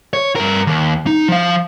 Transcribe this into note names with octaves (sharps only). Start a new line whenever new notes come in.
C#5
G2 A#4
D#2
D#4
F3 F5